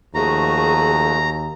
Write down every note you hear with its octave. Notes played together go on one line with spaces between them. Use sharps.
D#2 F3 A3 F#4 G#4 A#5